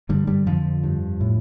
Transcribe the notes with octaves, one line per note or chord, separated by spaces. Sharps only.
G2 D3 G3
G2 G3
F2 D3 F3
G2
A2